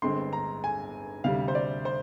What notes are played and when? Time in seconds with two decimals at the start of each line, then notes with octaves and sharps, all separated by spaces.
0.02 G1 G2 D3 G#3 C4 C6
0.33 A#5
0.64 G#5
1.24 D2 C3 G3 F5
1.48 C5
1.55 D5
1.85 C5